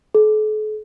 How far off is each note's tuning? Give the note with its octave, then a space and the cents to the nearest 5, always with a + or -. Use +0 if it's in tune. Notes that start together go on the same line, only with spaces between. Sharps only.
A4 -45